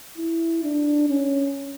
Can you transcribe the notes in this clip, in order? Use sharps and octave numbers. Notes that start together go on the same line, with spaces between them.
E4
D4
C#4